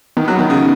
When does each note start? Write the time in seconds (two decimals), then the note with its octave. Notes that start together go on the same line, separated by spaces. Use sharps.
0.17 D#3 B3
0.28 F#3
0.39 D#3
0.50 C#3